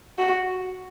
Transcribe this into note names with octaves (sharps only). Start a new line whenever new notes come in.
F#4